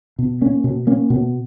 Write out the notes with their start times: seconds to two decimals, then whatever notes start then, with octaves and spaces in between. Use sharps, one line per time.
0.19 B2
0.41 A#3 C#4
0.64 B2
0.87 A#3 C#4
1.10 B2